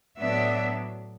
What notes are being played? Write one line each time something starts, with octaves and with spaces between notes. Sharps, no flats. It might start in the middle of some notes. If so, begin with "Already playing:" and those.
A2 F#3 B3 D4 E5